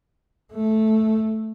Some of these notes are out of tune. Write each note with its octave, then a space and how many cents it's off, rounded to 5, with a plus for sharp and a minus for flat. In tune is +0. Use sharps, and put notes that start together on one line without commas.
A3 -5